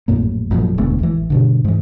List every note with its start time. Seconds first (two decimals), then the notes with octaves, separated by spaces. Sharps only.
0.08 A#1 F#2 A2 A#3
0.51 A1 F#2 A#2 F3
0.78 E1 D2 G#3 B3
1.00 A1 E3
1.30 G2 B2 D3
1.65 G#2 E3